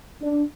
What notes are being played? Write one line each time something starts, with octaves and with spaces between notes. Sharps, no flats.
D4